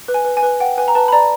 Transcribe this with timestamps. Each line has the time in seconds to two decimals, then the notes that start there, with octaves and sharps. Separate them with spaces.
0.08 B4
0.14 G#5
0.25 B4
0.37 G#5
0.43 B4
0.60 F#5 G5
0.78 B4 G#5
0.88 A#5
0.95 B4 A5
1.08 B5
1.12 D5 A#5